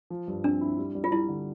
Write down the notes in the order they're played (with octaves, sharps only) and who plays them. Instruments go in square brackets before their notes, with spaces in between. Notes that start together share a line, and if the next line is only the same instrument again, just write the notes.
[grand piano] F3
G2
[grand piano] C4 [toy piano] D4
[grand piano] E4
G3
G3
[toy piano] F4
[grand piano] G3 [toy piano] E4
[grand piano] D3